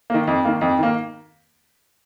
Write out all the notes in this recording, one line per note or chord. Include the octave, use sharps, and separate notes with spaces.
D#3 A#3
F2
D#3 A#3
F2
D#3 A#3